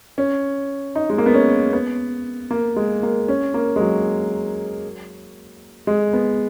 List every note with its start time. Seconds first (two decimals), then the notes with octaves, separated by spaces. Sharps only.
0.18 C#4
0.95 D#4
1.10 G#3
1.18 A#3
1.26 B3
1.34 C#4
1.73 B3
2.51 A#3
2.76 G#3
3.03 A#3
3.28 C#4
3.54 A#3
3.76 G#3
3.80 F#3
5.87 G#3
6.13 B3